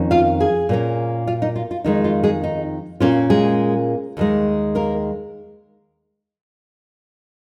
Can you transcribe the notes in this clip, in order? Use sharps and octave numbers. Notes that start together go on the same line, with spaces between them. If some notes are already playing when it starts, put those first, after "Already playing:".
Already playing: F2 D#3 A#3 C#4
F4 F5
G#4 G#5
A#2 A#3 C#4
F4 F5
D#4
F4
F4
F2 D#3 G#3 D#4
F4
G#3 G#4
D#4
A#2 A#3 C#4 F4
G#3 G#4
D#2 D#3 G#3
A#3 A#4